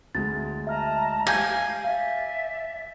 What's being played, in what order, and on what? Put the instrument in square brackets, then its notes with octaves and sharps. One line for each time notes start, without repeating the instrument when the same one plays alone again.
[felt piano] D2 G#3 [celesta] A6
[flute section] D#5 A5 A#5 [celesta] E5 F6
[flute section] G4 F5 [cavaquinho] G#5 [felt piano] G6 A#6
[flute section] D5 E5 [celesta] F5